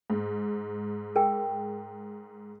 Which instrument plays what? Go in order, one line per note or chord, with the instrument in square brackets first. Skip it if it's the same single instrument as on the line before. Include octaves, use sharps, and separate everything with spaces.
[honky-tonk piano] G#2
[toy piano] G#4 A#4 G5